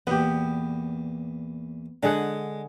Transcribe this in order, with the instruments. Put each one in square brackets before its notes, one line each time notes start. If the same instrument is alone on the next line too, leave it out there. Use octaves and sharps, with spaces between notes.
[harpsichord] E2 A#2 [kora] B3 G4
[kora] D3 G#4 F#5 [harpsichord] G#3